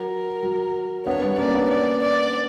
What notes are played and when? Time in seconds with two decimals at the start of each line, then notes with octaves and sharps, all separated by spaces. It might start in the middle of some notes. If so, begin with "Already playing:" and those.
Already playing: F#3 A#4
0.43 F#3
1.06 B3 D4 C#5
1.22 G3 B3
1.38 A#3 C#4 D5
1.54 B3 D4
1.70 D5
2.02 D5